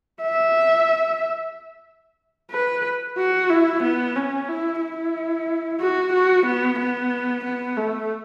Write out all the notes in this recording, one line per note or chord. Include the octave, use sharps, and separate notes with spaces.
E5
B4
F#4
E4
B3
C#4
E4
E4
F#4
F#4
B3
B3
B3
A3